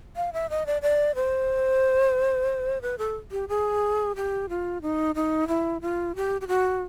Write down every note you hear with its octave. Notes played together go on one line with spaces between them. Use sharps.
F5
E5
D#5
D5
D5
C5
B4
A4
G4
G#4
G4
F4
D#4
D#4
E4
F4
G4
G4
F#4